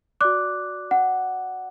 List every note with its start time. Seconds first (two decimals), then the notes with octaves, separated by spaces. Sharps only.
0.21 F#4 D5 D6 F#6
0.91 F#5